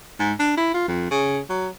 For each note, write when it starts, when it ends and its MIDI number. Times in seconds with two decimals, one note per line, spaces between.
0.20 0.32 44
0.39 0.52 62
0.57 0.71 64
0.74 0.86 65
0.88 1.08 41
1.11 1.39 49
1.50 1.68 54